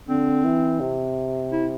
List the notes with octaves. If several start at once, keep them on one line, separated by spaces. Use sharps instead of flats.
D3 C4
E3
C3
E4